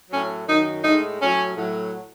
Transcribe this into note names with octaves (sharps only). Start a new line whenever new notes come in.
A2 F#3 C#4
F#2 D#3 F#3 D#4
A2 G#3 D#4
A2 F#3 C#4
A2 F#3